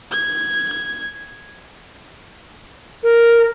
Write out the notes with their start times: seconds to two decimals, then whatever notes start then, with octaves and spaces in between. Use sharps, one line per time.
0.11 G#6
3.03 A#4